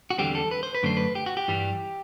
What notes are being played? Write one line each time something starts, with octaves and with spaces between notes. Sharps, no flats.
F#4
E2 D3 G3 C4 G4
A4
B4
C5
B4
F#2 D3 A3 D4 C5
B4
G4
F#4
G4
G2 E3 G3